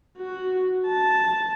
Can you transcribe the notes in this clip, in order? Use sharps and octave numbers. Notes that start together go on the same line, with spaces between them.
F#4
A5